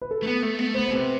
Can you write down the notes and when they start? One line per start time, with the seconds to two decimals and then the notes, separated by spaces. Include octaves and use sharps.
0.02 B4
0.11 A4
0.22 A3
0.27 B3
0.43 A3
0.59 B3
0.67 A3
0.74 B3 C5
0.85 C5
0.90 C3
0.95 B4